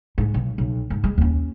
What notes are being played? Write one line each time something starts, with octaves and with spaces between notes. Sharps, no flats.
G#2
B1
B1
G#2
G#3
D#2 C#4